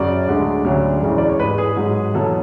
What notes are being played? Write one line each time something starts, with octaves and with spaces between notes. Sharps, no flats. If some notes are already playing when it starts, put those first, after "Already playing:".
Already playing: F#2 C#3 F#3 D5
D2 D3 G#3
D2 C#3 F#3
E2 C#3 E3 G#3
D5
C#5
G#2 G#3 B4
G#4
G#2 F#3
E2 B2 F#3 A4